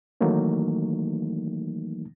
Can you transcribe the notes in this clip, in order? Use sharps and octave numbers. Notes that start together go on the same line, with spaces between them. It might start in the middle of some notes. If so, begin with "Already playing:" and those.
D#3 E3 F#3 A3 A#3 D#4